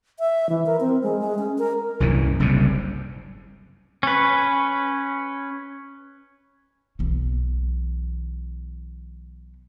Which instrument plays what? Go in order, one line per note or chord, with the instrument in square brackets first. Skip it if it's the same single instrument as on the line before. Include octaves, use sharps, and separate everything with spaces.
[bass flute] E5
E3
A#4
C4
G#3
G#3
C#4
A#4
[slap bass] C2 F#2 A#2 E3
F#1 C2 G#2 C3
[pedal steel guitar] C#4 B4
[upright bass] B1 E3